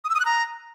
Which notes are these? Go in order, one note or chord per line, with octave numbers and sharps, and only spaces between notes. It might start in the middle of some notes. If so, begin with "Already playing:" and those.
D#6
E6
D#6
F#6
A#5